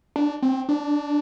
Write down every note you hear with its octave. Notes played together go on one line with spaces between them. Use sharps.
D4
C4
D4